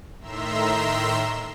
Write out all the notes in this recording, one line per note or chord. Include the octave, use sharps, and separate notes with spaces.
A2 D#3 E5 A#5 C6 E6